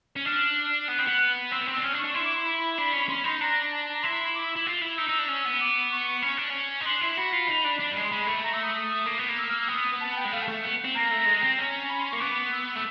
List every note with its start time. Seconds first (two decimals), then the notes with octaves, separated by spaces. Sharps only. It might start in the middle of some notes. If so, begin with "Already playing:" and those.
0.16 C#4
0.25 D4 F6
0.88 B3 F#6
0.99 C4
1.08 B3
1.51 C4 E6
1.61 B3
1.67 C4
1.77 D4
1.83 C#4 F6
1.93 D4
1.98 C#6
2.04 D4
2.14 E4 C6
2.25 D6
2.36 C6
2.46 B5
2.77 D4 B5
2.93 C#4
3.09 C#4 C6
3.17 B5
3.24 D#4 C6
3.40 D4 A#5
3.72 A5
3.82 A5
3.93 A#5
4.03 E4 C6
4.34 D6
4.45 E6
4.56 E4
4.67 F4
4.81 E4
4.97 D#4 E6
5.08 D#4
5.19 D4
5.28 C#4
5.45 B3
5.60 D6
5.92 C#6
6.23 C#4
6.38 D4
6.50 C#4
6.80 D#4
6.86 D4 C6
7.01 E4
7.17 F#4 B5
7.33 F4
7.48 D#4
7.65 D4
7.80 D4
7.91 G3
7.96 G#3
8.04 C6
8.12 G#3 B5
8.27 A3
8.43 A#5
8.53 E6
8.64 D#6
8.75 D#6
9.06 A#3
9.18 B3
9.29 A#3
9.38 E6
9.48 F6
9.59 E6
9.68 B3 D#6
10.01 A5
10.16 G5
10.25 G#3
10.32 A3 F5
10.42 A5
10.48 A3
10.63 B3
10.84 C4
10.95 A#3 A#5
11.11 A3
11.26 G#3
11.41 C4
11.58 C#4
11.89 B5
12.00 C6
12.10 C#6
12.13 A#3
12.20 B3 D6
12.52 E6
12.76 A3